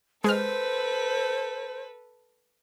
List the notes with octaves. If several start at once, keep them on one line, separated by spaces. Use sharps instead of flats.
G#3 A4 B4 C5 F6